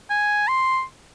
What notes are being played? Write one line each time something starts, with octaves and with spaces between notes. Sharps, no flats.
G#5
C6